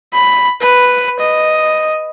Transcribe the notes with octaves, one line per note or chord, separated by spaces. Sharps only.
B5
B4
D#5